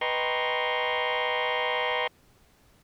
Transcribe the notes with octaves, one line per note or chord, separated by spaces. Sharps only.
B4 D#5 G5 A#5 C6 C#6